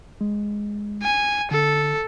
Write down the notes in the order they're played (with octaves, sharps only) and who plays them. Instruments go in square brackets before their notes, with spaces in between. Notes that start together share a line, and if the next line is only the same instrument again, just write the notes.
[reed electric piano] G#3
[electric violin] G#5
[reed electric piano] D3 [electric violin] A4